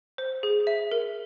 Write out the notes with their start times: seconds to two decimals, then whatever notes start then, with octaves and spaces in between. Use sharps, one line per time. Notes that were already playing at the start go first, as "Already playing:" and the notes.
0.18 C5
0.43 G#4
0.67 E5
0.91 A#4